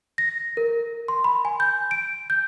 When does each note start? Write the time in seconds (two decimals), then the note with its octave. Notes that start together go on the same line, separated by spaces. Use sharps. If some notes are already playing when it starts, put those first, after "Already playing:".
0.18 A#6
0.57 A#4
1.08 C6
1.24 B5
1.45 G#5
1.60 G6
1.91 D7
2.30 G6